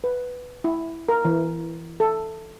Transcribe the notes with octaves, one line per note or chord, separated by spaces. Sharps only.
B4
E4
A#4
E3
A4